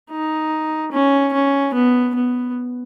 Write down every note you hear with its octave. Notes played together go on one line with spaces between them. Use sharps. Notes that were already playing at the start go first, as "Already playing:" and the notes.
D#4
C#4
C#4
B3
B3